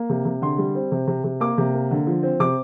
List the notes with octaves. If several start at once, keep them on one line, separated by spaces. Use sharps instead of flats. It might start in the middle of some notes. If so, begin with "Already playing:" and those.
Already playing: A#3
C3
C3
D3 C6
G3
C4
C3
C3
C3
A#3 D6
C3
A#3
D3
F3
C4
C3 D6